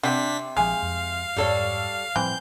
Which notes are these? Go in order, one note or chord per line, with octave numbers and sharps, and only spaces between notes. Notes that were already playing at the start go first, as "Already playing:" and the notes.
C3 C4 D4 G4 F#5 B6
A#1 D3 F3 G#3 G#4 F5
F2
F2 G#2 G3 A4 C#5
A2 E3 F3 G3 C4 G6